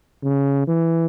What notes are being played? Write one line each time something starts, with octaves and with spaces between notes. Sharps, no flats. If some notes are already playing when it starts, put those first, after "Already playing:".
C#3
E3